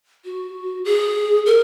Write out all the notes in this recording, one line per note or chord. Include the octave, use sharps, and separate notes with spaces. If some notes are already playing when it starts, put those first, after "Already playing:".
F#4
G#4
A#4